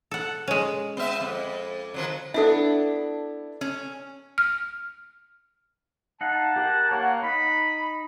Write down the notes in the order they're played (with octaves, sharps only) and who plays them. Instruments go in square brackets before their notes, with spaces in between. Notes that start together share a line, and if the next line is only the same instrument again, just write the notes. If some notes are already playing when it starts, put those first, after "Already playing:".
[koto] A4 F#5
G#3 C#4
[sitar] B3 E5
F2
D#3 F3 F#3
[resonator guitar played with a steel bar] B3 D4 E4 [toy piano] A4 E5
[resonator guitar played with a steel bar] C#4
[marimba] F6
[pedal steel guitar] D#4 F5 F#5 [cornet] A5
[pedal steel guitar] G4 A#4 F#5
[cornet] A#3 [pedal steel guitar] C#5 F#5
[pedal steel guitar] D#4 [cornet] B5